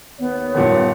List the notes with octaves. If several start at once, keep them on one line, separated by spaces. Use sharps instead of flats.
D#2 B3 C#5
G2 A#2 D#3